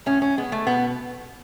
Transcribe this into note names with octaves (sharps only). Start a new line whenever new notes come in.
A2 C#4
C#4
G#3 B3
A3
B2 B3